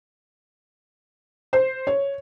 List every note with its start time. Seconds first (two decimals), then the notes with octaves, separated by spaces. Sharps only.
1.53 C5
1.87 C#5